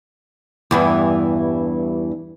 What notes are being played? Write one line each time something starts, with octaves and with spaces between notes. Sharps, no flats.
E2 G2 E3